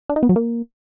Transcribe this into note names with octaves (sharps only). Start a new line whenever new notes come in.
D4
D#4
B3
F#3
A#3